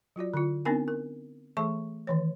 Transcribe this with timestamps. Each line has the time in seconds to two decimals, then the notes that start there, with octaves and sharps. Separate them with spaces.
0.16 F#3 F4 F#4 D5
0.34 D3 E4 F4
0.65 B3 C4 D4 D#4 A#4 G#5
0.88 A#4
1.57 E3 A3 G#4 A4 A5 C#6
2.07 D#3 E3 C#5